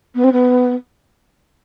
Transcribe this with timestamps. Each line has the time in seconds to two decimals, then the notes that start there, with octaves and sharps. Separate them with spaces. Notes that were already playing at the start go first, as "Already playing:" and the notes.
0.15 B3
0.24 C4
0.32 B3